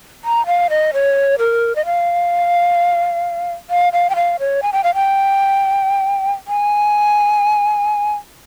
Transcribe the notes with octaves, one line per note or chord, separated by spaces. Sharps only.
A#5
F5
D#5
C#5
A#4
D#5
F5
F5
F5
G5
F5
C#5
G#5
G5
F5
G5
G#5